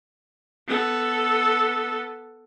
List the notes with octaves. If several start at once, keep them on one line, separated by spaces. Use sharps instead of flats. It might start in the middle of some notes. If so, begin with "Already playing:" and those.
B3 A4